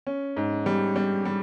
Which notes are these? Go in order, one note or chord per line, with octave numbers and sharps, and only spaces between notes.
C#4
G#2
G3
G3
G3